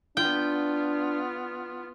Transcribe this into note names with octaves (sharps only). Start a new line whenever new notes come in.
B3 D4 F4 G5